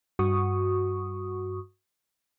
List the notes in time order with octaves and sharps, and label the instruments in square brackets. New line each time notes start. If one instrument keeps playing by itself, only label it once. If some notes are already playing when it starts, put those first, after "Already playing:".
[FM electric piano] G2 F#4 C#6 D#6